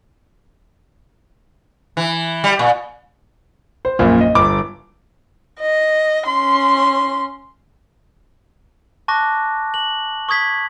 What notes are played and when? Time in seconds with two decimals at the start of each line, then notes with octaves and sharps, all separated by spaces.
1.97 E3
2.44 G3
2.59 A#2
3.85 C5
3.99 A#1 F#2 A#2 F4
4.21 D#5
4.35 G1 D6
5.60 D#5
6.27 C#4 C6
9.08 A5 C#6 D6 F#6 A#6
9.74 F#7
10.29 C#6 D#6 G#6 B6